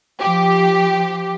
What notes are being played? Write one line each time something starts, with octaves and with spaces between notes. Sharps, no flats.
F3 G4